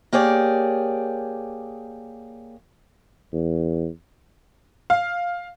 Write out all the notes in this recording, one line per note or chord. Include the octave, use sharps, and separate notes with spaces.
A#3 G4 G#4 C#5 D5
E2
F5